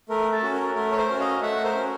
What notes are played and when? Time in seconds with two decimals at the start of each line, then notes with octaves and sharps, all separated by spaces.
0.09 A3 A#4
0.32 A4
0.43 C#4 F#4
0.53 A#4
0.76 A3 A#4
0.92 C#5
0.98 A#4 C5
1.09 C#4 F#4
1.20 D#5 F5
1.42 A3 E5 F#5
1.64 A#4 C5
1.76 C#4 F#4